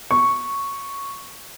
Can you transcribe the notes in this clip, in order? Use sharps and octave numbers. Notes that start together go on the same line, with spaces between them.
C#6